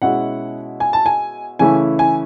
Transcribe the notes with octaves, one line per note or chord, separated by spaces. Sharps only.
B2 G#3 C#4 E4 F#5
G#5
A5
G#5
C#3 E3 A3 C#4 E4 G#5
G#5